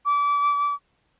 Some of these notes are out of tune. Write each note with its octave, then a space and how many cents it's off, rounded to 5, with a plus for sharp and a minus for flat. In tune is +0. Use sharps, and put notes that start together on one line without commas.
D6 -30